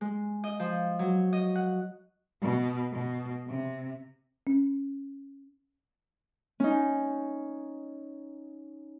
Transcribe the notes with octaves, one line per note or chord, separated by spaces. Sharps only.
G#3
D#5
F3
F#3
D#5
F#5
B2
B2
C3
C#4
C#4 D#4